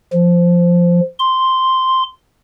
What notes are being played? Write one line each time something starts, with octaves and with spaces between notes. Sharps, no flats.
F3
C6